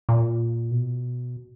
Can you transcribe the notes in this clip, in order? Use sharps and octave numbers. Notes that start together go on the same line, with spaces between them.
A#2
B2